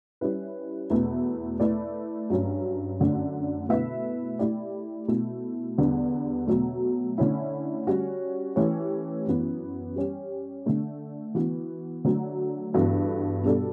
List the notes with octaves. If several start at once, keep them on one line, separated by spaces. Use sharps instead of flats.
G3 C#4 E4 B4
E2 B2 A3 E4 B4
A3 E4 B4 D5
G2 F#3 C#4
F#2 D3 A3 D4
B2 A3 E4 B4 E5
A3 E4 G4 D5
B2 A3 E4
E2 D3 G3 B3 D4
B2 F#3 A3
D3 A3 C#4 E4
G3 C#4 F#4 C#5
E3 A3 C#4 G4 C#5
F#2 E3 B3
G3 C#4 G4
D3 A3 D4
E3 B3 F#4
D3 F#3 A3
G2 E3 B3 F#4 A4
B2 G3 D4 A4